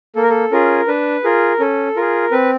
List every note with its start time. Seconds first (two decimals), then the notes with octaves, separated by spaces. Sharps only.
0.16 A#3 A4
0.22 A#4
0.30 A4
0.51 C#4 F4 G#4 A#4
0.88 D4 B4
1.24 F4 G#4 A#4
1.60 C#4 A4
1.96 F4 G#4 A#4
2.31 C4 B4